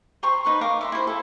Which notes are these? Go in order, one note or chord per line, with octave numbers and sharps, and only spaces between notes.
C5 A#5 C6 C#6
D#4 B4 C#6
A#4 F5 D6
E5 B5 C6
E4 C5
E4 A4